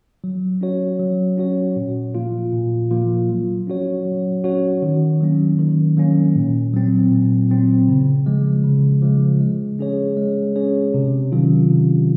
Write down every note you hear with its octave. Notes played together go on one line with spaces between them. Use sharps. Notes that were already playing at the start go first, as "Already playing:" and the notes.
F#3
C#4 F#4 C#5
F#3
C#4 F#4 C#5
A#2
F3 A#3 F4
A#2
F3 A#3 F4
F#3
C#4 F#4 C#5
F#3
C#4 F#4 C#5
D#3
F#3 A#3 C#4
D#3
F#3 A#3 C#4
A#2
F#3 C4
A#2
F#3 C4
C#3
F3 G#3
C#3
F3 G#3
G#3
C#4 G#4 C#5
G#3
C#4 G#4 C#5
C3
D#3 F#3 C#4 F4
C3